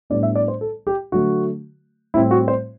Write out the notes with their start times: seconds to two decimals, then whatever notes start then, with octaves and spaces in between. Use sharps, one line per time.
0.10 A2 G3 B3 D4 D5
0.23 E5
0.35 D5
0.48 C5
0.61 A4
0.87 G4
1.12 D3 F#3 A3 F#4
2.14 A2 G3 C4 E4
2.31 F#4
2.48 C5